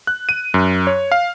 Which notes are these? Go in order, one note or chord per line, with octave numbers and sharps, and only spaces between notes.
F#6
D#7
F#2
C#5
F5